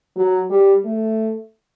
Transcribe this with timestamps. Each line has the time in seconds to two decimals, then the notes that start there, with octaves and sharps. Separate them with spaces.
0.16 F#3
0.50 G3
0.85 A3